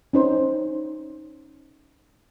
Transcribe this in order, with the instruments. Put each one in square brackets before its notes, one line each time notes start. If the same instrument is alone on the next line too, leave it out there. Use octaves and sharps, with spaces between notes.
[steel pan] C#4 D#4 C5